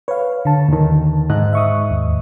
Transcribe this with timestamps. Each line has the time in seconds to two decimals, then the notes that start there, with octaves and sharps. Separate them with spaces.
0.08 B4 C#5 F5
0.45 D3 A5
0.68 D#2 D#3
1.30 G#2 D#5 F#6
1.53 E5 C#6 D#6
1.91 D#2